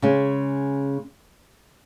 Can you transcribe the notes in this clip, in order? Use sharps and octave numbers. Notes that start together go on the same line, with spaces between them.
C#3 G#3 C#4